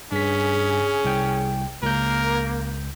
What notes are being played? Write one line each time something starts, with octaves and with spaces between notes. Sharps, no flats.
G2 C#4 G#4 B6
C2 G5
C#2 A#3 A#4 G6